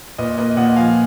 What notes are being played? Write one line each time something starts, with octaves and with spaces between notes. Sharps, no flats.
A#2 B4 D#5
A#3 B4 D#5
A#2 D#5 F#5
F3 F5 G#5